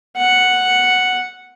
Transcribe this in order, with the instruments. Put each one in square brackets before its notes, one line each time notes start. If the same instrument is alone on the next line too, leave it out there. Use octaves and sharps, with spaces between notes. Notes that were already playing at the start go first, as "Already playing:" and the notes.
[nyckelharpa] F#5